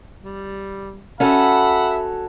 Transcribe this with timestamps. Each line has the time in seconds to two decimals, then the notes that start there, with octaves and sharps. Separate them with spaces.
0.22 G3
1.20 C#4 F#4 A4 E5 F#5 B5